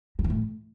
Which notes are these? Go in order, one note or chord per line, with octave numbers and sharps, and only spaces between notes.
F#3
E3
A2